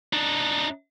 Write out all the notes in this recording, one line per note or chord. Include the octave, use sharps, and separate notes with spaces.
D4 D#4